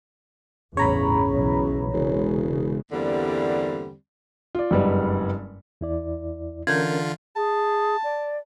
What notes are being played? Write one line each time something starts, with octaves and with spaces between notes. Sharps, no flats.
A1 E2 G2 C#3 C#5 A#5 B5
B1 B2 E3
E1 C#3 G#3
E2 G2 D3 G3 A#3 C4
F4 D5
F#1 G2 G3 G#3 B3
E2 E4 D5
D3 E3 C#4 F4 A#4 G6
G#4 A5
D5